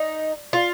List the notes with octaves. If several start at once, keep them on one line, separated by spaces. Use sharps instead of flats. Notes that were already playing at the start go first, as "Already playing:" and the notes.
Already playing: D#4
F4